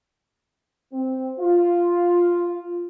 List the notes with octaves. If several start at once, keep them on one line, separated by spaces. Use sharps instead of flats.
C4
F4